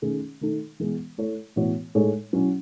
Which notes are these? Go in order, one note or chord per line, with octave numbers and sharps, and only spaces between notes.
D#3 A3 C#4 G#4
D#3 A3 D#4 A4
E3 G#3 B3
A3 E4 A4 C#5
A2 E3 B3 F#4 C#5
A2 G#3 D#4 A4 C#5
F#3 C#4 E4